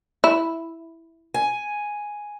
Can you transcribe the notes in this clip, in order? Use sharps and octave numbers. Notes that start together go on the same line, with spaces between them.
E4
G#5